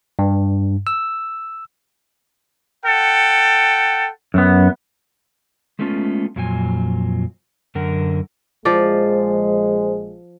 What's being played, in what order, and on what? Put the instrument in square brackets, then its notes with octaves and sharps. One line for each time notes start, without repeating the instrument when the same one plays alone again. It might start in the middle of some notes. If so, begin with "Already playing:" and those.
[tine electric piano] G2
E6
[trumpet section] A4 F#5 G5
[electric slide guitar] F#2 B3
G#3 A3 B3 C#4 F4 A4
F2 A#2 F#3 F4 G#5
F#2 D3 A#4 F#5
[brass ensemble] A#1 G#3 [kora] F3 D5 [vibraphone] C5